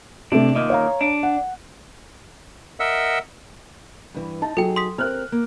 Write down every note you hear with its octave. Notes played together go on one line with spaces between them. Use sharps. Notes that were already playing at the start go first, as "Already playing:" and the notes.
C3 A3 D4
A#2 D#3 D#5
C#5 F5 A#5
D4
F#5
A#4 D#5 E5 F#5 E6
G2 E3
D#4 A5
F#3 D#4 G#4 A4 G5
C6 D#6 B6
C4 G4 A#4 F6 F#6
A#3